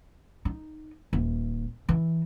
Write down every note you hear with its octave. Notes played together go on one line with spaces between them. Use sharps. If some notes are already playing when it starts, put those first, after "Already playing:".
D#4
D#1
E3